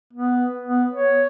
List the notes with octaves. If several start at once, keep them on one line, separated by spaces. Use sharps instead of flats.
B3
B3
C#5